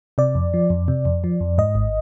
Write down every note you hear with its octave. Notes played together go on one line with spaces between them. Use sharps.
C3 D5
F2
F3
F2
C3
F2
F3
F2
G#2 D#5
G#1